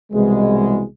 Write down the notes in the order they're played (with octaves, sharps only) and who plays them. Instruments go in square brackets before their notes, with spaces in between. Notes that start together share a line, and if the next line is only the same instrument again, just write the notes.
[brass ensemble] C2 B2 E3 G#3